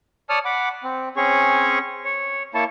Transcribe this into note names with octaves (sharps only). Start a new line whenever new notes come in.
C#5 D5 A5 D#6 F6
F#5 B5 D6
C4
C4 C#4 G#4 C#5 C#6
C#5
A#3 E4 C#5 A5